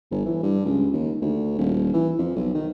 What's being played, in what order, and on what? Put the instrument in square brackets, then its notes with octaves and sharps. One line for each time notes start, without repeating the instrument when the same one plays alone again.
[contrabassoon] G1
E3
G2
C#2
D#2
D2
D#1
E3
F2
B1
D#3